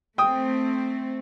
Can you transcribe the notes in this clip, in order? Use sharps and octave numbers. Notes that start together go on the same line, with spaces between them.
A3 C4 G5 D#6